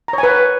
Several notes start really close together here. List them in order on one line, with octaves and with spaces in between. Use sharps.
A#5 C#5 G#5 B4